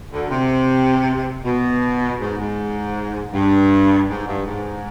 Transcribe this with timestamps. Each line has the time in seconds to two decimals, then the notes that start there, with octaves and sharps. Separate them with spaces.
0.11 D2 D3
0.30 C3
1.44 B2
2.19 G#2
2.38 G#2
3.33 G2
4.09 G#2
4.27 G2
4.46 G#2